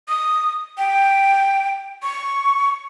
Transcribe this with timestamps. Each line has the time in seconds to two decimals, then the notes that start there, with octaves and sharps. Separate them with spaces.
0.08 D#6
0.78 G5
2.03 C#6